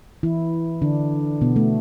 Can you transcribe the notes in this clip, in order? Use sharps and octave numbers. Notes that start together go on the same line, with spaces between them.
E3 E4
D3 D4
B2 B3
A3